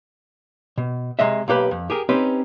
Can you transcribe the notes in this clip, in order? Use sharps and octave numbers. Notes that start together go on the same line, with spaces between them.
B2
C3 G#3 D#5 E5
B1 A#3 G4 B4 B5
F2
G4 G#4 A#4
C4 C#4 D#4 G4 B4